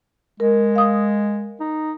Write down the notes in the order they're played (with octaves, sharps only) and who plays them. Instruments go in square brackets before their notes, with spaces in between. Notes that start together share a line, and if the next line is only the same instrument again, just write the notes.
[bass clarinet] G#3 [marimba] A#4
[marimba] F5 D#6
[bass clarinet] D#4